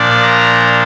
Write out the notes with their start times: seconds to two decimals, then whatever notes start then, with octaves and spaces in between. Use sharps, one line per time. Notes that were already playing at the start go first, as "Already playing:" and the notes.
Already playing: A#2 F3 D4 D5
0.22 A#5